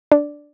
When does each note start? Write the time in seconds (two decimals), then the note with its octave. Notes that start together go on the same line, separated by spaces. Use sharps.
0.12 D4